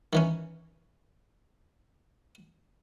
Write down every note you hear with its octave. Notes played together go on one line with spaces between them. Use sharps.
D#3 E3 C#4